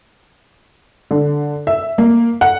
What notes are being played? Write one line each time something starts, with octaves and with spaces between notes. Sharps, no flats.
D3
E5
A#3
F#5